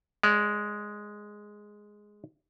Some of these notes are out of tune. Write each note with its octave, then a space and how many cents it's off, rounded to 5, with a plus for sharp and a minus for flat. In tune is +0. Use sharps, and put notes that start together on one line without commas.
G#3 +0 D5 -30